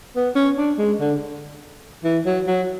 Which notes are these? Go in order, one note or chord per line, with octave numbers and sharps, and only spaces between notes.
B3
C#4
D4
G#3
D3
E3
F#3
F#3